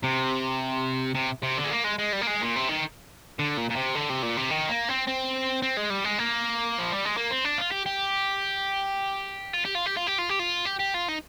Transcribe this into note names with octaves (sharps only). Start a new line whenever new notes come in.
C3
C3
C3
D3
G#3
A#3
G#3
G#3
G3
A#3
G#3
A#2
C3
D#3
D3
A#2
A#2
C3
D3
C3
A#2
C3
D#3
A#3
C4
C4
C4
G#3
G3
G#3
A#3
F3
G3
G#3
A#3
C4
D4
F4
G4
G4
F4
G4
F4
G4
F4
G4
F4
G4
F4
G4
G4
F4
D#4